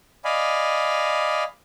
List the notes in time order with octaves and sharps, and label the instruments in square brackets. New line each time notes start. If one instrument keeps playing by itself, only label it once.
[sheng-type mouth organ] D5 D#5 F5 G#5 B5